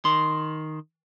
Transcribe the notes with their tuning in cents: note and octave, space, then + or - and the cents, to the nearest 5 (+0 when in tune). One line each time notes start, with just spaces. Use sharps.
D#3 +0 C6 +0